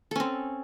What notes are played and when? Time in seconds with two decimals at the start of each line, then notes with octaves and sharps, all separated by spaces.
0.11 A4
0.16 C#4
0.20 C4